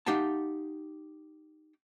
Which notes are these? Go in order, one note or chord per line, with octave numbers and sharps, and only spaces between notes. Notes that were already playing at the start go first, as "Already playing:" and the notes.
D#4 G4 F5 F#5 A5